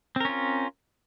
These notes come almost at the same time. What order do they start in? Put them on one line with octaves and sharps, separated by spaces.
C4 A#4 C#4 F4